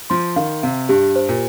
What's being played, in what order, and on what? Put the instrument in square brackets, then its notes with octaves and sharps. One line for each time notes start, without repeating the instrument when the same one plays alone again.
[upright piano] F3 [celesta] C6
[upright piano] D#3 [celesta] F5
[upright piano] C3 [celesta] F5
[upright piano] G2 [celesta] G4
[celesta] C5
[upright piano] A#2